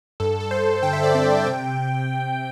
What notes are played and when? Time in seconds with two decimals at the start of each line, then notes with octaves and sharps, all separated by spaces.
0.20 G2 A4
0.40 A4
0.51 G2 C5
0.83 D3 G5
0.93 E5
1.03 D5
1.13 C4 E5
1.42 E5
1.46 C3 G5
1.78 C3